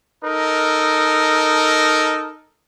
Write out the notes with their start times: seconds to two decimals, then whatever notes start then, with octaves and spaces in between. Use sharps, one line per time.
0.24 D#4 A4 A#4